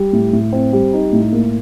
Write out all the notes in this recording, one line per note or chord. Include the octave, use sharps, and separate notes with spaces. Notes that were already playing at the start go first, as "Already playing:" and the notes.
Already playing: G3
A2
A2
C4
G3
D#4
A2
A#3